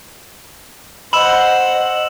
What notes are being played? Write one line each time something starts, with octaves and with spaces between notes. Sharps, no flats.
C5 D#5 F#5 B5 E6 E7 F#7